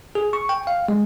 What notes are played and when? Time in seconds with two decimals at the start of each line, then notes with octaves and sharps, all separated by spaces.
0.15 G#4
0.33 C#6
0.49 G5
0.67 F5
0.88 G#3